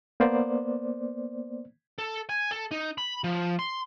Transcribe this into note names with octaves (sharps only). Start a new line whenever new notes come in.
A#3 B3 C5 D5
A4
G#5
A4
D#4
B5
F3
C6